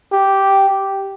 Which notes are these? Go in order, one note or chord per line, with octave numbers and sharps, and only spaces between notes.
G4